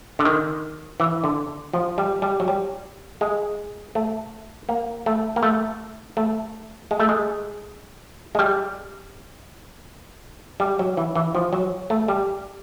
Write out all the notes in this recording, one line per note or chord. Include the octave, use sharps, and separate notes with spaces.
D3
D#3
E3
D3
F3
G3
G3
F#3
G3
G#3
A3
A#3
A3
A#3
A3
A3
G#3
A3
G#3
G#3
G3
G3
F#3
E3
E3
F3
F#3
A3
G3